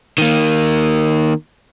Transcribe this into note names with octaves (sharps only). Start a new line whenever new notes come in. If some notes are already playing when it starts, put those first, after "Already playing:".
D#3 A#3